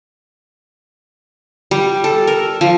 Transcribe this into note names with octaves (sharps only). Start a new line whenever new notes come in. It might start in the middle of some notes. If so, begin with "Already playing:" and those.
G3
A4
A#4
F3